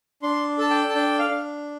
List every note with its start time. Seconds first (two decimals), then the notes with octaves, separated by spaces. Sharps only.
0.23 D4 C6
0.58 A4 A5
0.70 G5
0.89 A5
0.94 D4 G5
1.19 F5
1.30 D4